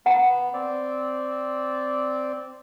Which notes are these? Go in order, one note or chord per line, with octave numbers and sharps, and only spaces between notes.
B3 F#5 A#5
C4 D5